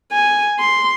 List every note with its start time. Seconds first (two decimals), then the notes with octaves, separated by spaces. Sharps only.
0.12 G#5
0.59 C6